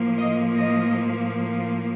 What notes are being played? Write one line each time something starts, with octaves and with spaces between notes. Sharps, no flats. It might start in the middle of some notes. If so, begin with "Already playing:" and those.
Already playing: A2 F3 A#3
D#5
D#5